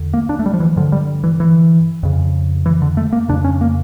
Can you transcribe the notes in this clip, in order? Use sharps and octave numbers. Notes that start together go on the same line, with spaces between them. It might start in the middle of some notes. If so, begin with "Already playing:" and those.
Already playing: E2 D3
A#3
D4
A3
G3
F3
E3
G2 D3 F3
G3
E3
E3
F2 C#3
E3
D3
A3
A#3
F2 C#3 D4
C#4
A#3